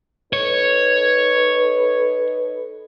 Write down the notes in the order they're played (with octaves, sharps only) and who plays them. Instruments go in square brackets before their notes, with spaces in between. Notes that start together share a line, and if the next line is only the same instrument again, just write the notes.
[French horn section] D#4 A4 B4 [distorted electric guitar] C#5